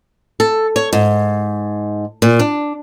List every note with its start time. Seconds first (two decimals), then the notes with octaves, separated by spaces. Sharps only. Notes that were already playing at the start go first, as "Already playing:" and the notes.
0.40 A4
0.76 C#5
0.93 G#2
2.22 A#2
2.39 D4